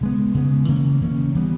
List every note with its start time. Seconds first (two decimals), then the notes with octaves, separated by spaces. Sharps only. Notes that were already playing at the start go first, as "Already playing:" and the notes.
0.01 C#3 G#3 B3
0.35 C#3 G#3 B3
0.68 C#3 E3 A#3 C#4
1.01 C#3 E3 A#3 C#4
1.35 E3 G3 B3